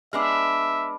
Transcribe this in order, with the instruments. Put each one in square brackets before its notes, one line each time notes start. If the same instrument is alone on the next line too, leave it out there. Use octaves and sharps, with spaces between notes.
[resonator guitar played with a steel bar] G#3 B3 D4 [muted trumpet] E5 [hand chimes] D6 F6